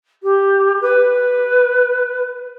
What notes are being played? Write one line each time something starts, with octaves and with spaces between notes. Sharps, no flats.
G4
B4